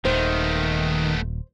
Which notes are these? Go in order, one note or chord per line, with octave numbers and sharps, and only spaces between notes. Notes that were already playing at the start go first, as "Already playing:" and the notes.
D#1 D#3 A3 B3 C5